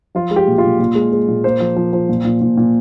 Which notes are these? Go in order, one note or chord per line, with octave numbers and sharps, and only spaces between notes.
F3 F4
G#3
G4
A#2
F4
A#2
A#2
G#3
G#3
A#2
A#3 C5
F3
F3
F3
A#2
A#2
A#2
A#2